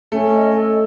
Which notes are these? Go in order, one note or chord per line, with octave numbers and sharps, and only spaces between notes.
A3 C#4
D#5
A4